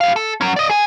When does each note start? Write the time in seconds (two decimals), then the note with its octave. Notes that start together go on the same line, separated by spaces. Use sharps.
0.01 G4 F5
0.16 A4
0.41 F#3 C#4
0.56 D5 D#5
0.69 G#4 G#5